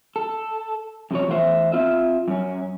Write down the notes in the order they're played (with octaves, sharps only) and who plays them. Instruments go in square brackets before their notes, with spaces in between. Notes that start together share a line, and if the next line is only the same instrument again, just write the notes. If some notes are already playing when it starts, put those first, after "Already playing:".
[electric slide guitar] A4
F#2 C3 F3 C#5
E2 A3 B3 F4 C5 E5
C4 F4 E5
F#2 C#4